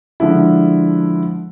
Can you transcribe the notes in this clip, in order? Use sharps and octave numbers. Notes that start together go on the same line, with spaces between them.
D3 F3 G#3 D4 E4